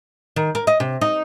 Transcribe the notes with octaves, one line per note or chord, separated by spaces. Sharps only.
D#3
A#4
D#5
C3
D#4